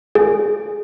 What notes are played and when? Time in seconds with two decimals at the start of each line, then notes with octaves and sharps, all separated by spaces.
0.15 G#4